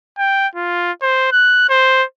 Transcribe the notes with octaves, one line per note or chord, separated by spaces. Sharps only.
G5
F4
C5
F#6
C5